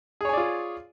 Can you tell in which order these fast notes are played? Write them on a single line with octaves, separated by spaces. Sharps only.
G#4 C#5 G#5 D5 F4